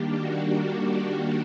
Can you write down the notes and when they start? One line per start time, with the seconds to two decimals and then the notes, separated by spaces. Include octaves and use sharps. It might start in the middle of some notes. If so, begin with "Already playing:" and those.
Already playing: D#3 G3 A#3 D4 G4
0.18 F#4
0.56 F#4
0.94 G4